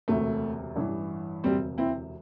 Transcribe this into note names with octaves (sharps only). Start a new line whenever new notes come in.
E1 D2 C3 A3
A1 G2 E3
E1 D2 C3 G3 C4
C4 E4